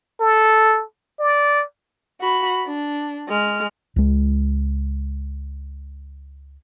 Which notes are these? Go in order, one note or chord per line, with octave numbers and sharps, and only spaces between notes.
A4
D5
F#4 B5
D4
G#3 F6
C#2 G#3